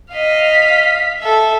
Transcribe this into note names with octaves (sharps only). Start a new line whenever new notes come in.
D#5 F5 B6
A4 E5